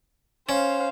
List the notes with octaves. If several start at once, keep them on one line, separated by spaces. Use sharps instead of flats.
C#4 C5 F5